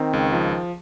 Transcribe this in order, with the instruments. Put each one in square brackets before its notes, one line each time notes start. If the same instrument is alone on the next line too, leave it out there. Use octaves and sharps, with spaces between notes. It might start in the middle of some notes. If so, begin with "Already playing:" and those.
Already playing: [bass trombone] D#3 [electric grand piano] C4
[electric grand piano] C#2
F3